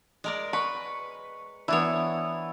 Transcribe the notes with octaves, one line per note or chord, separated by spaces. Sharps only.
G#3 A#4 D5
B4 C#6
E3 B3 D4 E4 C#5